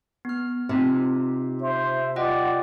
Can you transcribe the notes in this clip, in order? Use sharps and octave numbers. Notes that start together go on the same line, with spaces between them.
B3 F6
C3 C4 D#4 F4
C5 E5
F4 D5 D#5 F#5 G5